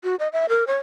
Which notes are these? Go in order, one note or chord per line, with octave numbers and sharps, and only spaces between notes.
F#4
D#5
E5
A#4
C#5